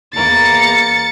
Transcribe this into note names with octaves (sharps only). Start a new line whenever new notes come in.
E2 A#3 A#4 A6 C#7